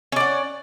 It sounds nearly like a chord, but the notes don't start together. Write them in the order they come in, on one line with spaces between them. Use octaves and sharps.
C#4 D5 F#5